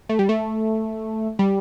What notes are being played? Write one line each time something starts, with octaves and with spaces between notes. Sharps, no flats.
A3
G3
A3
G3